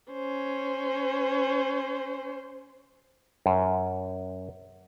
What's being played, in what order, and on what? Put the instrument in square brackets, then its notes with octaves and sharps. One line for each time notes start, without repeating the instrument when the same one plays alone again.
[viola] C#4 C5
[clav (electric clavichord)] F#2